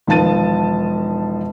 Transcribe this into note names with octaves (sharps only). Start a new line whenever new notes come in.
E1 D#3 F3 A5 A6 D#7